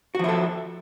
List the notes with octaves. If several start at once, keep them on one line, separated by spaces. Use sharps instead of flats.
F3 E4 F#4 A4